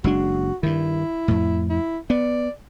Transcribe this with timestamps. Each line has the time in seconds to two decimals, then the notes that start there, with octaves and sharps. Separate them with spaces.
0.04 F#1 G#3 D4 F#4
0.63 G2 D#3 E4
1.28 F2 A2
1.69 E4
2.10 B3 D5